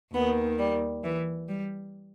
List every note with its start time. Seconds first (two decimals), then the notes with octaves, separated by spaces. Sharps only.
0.14 D#2 D#3 B3
0.58 G3
1.04 E3
1.48 G3